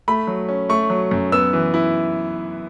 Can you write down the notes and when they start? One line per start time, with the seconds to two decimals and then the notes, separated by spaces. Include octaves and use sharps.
0.08 A3 B5
0.27 F#3
0.49 C#4
0.69 A3 C#6
0.90 F#3
1.11 F#2
1.32 B3 E6
1.53 E3
1.74 E4